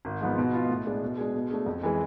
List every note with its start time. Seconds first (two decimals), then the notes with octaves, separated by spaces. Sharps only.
0.05 G#1
0.21 G#2 F3 B3
0.38 B2
0.53 B3 F4
0.70 A2
0.86 G#3 D4
1.02 B2
1.18 G#3 D4 G#4
1.34 B2
1.50 A3 D4 G#4
1.66 F2
1.83 E3 G#3